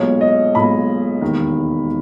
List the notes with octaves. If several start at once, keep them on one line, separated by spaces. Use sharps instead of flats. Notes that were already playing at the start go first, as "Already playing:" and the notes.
Already playing: B1 A#2 G#3 C#5
D#5
B1 A#2 G#3 B5
E1 D#2 D#3